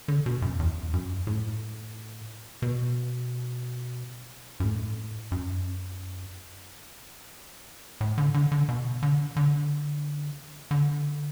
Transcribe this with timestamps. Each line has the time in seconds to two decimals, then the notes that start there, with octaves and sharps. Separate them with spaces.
0.08 D3
0.26 B2
0.42 F#2
0.59 E2
0.93 F#2
1.27 A2
2.62 B2
4.60 F#2
4.64 A2
5.32 F#2
8.01 A2
8.18 D3
8.34 D3
8.52 D3
8.69 B2
9.03 D3
9.36 D3
10.71 D3